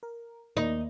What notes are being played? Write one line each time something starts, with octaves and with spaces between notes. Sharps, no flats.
A#4
D#2 A#3 D#4